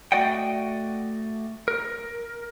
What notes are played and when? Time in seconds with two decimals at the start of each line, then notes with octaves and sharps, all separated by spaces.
0.12 A3 F#4 D5 D#5 F#5 G5
1.68 A#4